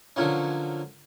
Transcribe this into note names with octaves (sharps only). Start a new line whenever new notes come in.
D3 F3 F#3 A#3 C#4